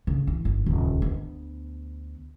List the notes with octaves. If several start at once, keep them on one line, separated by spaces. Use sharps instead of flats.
C#3
E3
G1
D#1 C#2
D2 B3